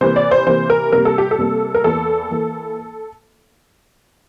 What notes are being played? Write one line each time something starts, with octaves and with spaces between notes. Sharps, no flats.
C3 E3 A#3 C5
D5
C5
C3 E3 A#3 C5
A#4
C3 G3 A#3 A#4
A4
G4
A4
C3 G3 A#3
A#4
E2 E3 A#3 A4
E3 A#3